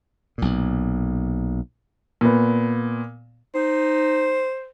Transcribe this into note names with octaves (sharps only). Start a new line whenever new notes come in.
B1 A#2
A#2 B3
D#4 C5